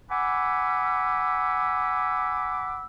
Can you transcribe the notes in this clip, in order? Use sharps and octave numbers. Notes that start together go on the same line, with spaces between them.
F#5 G#5 B5 D6 E6